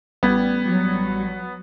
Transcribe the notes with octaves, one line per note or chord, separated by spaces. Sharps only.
A1 G3 B3 G#6
F#3